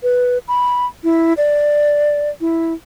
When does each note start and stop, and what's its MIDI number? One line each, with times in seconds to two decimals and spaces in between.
0.03 0.38 71
0.48 0.86 83
1.04 1.33 64
1.37 2.30 74
2.41 2.73 64